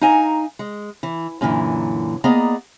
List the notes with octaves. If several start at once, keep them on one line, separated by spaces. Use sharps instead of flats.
D#4 F5 G#5 A#5
G#3
E3
F#2 A#2 D3 E3
A#3 B3 G#4 D5 D#5 A#5